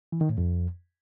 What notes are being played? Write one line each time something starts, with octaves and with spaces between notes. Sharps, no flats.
E3
D#3
A2
F2